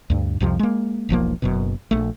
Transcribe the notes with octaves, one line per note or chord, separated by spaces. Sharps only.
D2 G2
C2 F2 C3 F3
G#3 A#3
E1 B1 F3 A#3
F#1 F#2 B2
A#1 A3